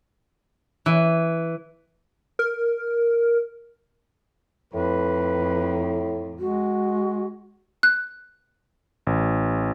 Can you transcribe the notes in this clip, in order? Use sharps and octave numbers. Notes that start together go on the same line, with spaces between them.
E3
A#4
F2 A2 B4
G#3 F#4
F#6
A1